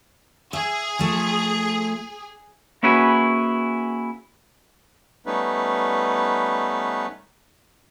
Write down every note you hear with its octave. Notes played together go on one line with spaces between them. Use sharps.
G#4 E5
F3 A3
A#3 C#4 E4 F#4 G#4 B4
G3 A3 B3 C#4 D#4 B4